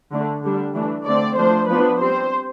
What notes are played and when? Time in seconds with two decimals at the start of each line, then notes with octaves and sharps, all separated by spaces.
0.12 D3 A3 D4
0.44 D3 G3 D4
0.75 E3 A3 D4
1.06 D3 A3 C4 D5
1.37 F3 A3 D4 C5
1.69 F3 B3 D4 B4
2.00 G3 C4 C5